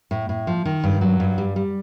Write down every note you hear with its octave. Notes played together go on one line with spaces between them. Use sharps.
A2
A2
F3
D#3
G2
F#3
G2
G3
G3